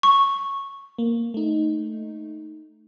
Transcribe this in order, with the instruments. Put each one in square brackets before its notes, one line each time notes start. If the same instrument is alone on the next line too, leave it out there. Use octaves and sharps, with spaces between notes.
[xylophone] C#6
[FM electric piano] A#3
A3 D#4